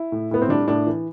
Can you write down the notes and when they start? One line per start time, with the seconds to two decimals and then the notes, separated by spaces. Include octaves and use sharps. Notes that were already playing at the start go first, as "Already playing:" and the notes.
Already playing: E4
0.12 A2
0.31 A2 B3
0.42 C4
0.49 G3 D4
0.68 A2 D4
0.87 E3